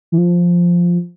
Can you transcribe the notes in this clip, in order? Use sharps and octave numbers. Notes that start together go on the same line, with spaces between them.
E3
F3